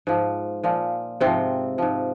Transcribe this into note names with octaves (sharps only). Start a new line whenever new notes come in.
G#2 F3
A#2 F3
G#2 C3 F3 C4
G#2 F3